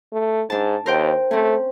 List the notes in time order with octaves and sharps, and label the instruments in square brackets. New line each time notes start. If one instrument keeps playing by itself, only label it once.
[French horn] A3
[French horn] G#2 [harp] D4 A5
[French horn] D#2 [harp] A#4 C5 G5
[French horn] A3 [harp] C4 C#4